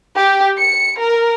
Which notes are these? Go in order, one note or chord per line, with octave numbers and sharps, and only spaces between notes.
G4
C#7
A#4